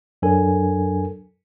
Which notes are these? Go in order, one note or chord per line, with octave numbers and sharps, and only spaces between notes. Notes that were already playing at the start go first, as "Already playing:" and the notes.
F#2 F#3 D4 A4 A#4 G#5